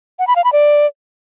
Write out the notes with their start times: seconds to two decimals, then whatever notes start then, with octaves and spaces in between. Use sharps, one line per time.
0.19 F#5
0.27 B5
0.36 F5
0.44 B5
0.53 D5